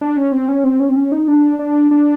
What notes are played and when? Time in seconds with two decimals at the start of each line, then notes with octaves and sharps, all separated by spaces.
0.01 D4
0.17 C#4
0.32 C4
0.48 C#4
0.64 C4
0.80 C#4
0.89 C4
0.96 C#4
1.12 D#4
1.28 D4
1.59 D4
1.91 D4